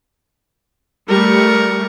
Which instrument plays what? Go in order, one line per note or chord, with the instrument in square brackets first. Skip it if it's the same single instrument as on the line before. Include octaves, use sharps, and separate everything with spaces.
[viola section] G3 A3 [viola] A#4 C#6